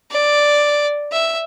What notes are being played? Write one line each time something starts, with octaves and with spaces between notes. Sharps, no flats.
D5
E5